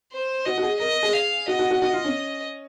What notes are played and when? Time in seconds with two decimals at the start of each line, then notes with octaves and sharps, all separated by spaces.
0.12 C5
0.45 F#4 D#5
0.58 F#4
0.63 G#4
0.80 A#4 D#5
0.91 A#4
1.03 G#4
1.13 F5
1.48 F#4 D#5
1.59 F#4
1.70 F#4
1.82 F#4 D#5
1.93 F4
2.04 C#4